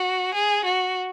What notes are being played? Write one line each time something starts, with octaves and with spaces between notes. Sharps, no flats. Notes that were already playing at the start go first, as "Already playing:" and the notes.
Already playing: F#4
G#4
F#4